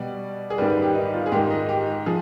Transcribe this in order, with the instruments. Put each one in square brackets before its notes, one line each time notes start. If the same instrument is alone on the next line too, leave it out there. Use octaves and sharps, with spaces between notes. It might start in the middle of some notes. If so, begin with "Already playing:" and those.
Already playing: [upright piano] B2 G3 D5
G#4
G#2 D#3 G3 B4
B4
G4
D#4
F4
G#4
G#2 D#3 G#3 G4
D#5
G4
F3 G#4